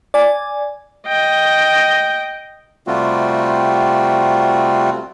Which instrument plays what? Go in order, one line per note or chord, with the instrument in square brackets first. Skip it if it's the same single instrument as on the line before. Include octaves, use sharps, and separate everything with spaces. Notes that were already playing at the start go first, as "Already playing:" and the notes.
[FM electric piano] D5 G#5
[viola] D#5 G5
[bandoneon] C3 G3 A3 C4 F4 F#4